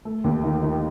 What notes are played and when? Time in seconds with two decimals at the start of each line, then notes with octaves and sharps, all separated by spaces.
0.05 A3
0.24 D#2
0.44 D#3
0.62 D#3